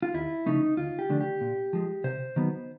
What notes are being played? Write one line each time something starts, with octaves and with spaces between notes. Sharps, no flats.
F4
D#2 E4
C#3 F3 A3 C#4 D#4
D2 F4
G4
D3 F3 A3 D4
G4
A#2
F3 G#3
C3 C5
D#3 F#3 B3